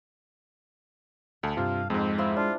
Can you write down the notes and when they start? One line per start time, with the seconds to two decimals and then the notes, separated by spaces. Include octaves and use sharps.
1.43 D2 A4
1.57 G2 C3 F4 F5
1.90 F2 G#2 G#3 C4
2.18 C4 E4 F4 E5
2.36 D4 F4